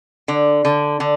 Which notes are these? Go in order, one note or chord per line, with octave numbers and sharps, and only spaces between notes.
D3
D3
D3